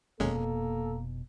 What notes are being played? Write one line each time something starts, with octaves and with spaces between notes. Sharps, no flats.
F1 D#2 B2 G#3 A#3 C#4 A4